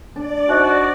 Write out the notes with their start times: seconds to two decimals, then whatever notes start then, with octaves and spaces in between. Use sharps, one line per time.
0.16 D4 D5
0.49 D#4 F#4 C5 D#5